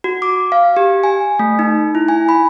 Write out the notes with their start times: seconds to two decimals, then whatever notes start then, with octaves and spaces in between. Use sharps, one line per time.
0.04 F#4
0.22 D6
0.52 F5
0.77 G4
1.03 G#5
1.39 A3
1.59 D#4
1.95 E4
2.08 G#5
2.29 B5